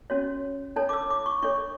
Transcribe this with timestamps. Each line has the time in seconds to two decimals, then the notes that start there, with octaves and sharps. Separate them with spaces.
0.10 C#4 F#4 C#5
0.76 D4 A4 C#5 A5
0.89 D6
0.93 E6
1.10 D6
1.26 C#6
1.42 D4 A4 C#5 C#6